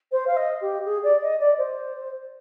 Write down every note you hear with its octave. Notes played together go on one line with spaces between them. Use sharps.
C5
F5
D#5
G4
G#4
D5
D#5
D5
C5